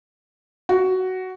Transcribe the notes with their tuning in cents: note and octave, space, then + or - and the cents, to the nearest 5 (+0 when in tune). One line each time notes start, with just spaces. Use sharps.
F#4 +10